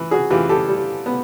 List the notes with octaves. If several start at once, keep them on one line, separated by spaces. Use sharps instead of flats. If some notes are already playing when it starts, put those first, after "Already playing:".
Already playing: E3
F#4 G#4
E3 F4 G4
G4 A4
G3
B3